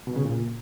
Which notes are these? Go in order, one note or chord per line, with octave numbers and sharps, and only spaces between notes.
B2
C#3
A#2